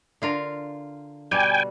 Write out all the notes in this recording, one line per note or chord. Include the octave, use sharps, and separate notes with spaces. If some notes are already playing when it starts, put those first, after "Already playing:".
D3 F4 A#4
B2 G3 G5 G#5